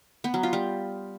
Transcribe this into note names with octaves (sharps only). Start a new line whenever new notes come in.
B3
F#3
F4
G3